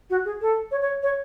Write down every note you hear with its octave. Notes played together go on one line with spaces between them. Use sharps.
F#4
G#4
A4
C#5
C#5
C#5